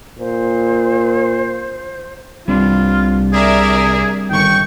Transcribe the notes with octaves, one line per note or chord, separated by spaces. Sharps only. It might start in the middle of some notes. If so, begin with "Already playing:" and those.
A#2 C5
C2 G3 C4 D4 F4
G#4 A#4 D5 E5
G1 D#3 G5 C#6